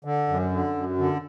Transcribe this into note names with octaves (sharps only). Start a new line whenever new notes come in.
D3
F#2
D3
F#2
D3